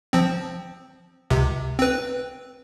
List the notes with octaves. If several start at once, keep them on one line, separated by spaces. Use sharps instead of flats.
F3 C4
C#2 C3
C4 B4